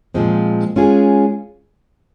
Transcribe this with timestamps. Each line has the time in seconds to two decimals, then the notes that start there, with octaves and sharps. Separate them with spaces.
0.14 A#2 F3 G#3 C4
0.76 G#3 C#4 F4 G#4